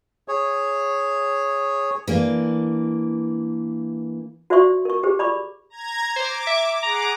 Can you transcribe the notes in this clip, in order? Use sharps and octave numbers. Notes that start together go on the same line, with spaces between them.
G#4 C#5
E3 A#3 D4
F#4 C5 D5 E5 C6 C#6
A#4 C#6
G4 G#4 C5
D5 B5 C#6 D6
A#5 G#6
C5 D6
E5
G#4 F#5 A#5 D6